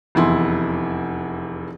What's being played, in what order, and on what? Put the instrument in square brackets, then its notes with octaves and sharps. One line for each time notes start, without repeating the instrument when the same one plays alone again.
[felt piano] F1 E2 E4 C6